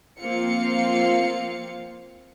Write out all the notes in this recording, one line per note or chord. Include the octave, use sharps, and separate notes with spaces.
F3 A#3 C4 F4 F5 C#7